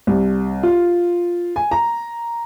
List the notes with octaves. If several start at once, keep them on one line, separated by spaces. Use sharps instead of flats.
C2
F4
G#5
A#5